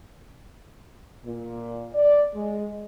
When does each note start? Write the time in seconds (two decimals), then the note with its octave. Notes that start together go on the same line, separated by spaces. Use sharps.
1.25 A#2
1.94 D5
2.35 G#3